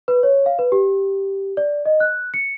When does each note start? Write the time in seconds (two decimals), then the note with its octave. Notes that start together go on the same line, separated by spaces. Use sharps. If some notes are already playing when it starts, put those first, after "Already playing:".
0.08 B4
0.23 C#5
0.46 F5
0.59 B4
0.72 G4
1.57 D5
1.86 D#5
2.00 F#6
2.34 C#7